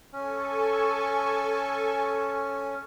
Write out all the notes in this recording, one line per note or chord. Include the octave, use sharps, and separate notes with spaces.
C#4 A4 G#5 C#6